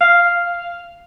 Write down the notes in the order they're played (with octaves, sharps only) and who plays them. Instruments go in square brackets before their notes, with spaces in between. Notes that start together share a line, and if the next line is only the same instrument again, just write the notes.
[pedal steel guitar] F5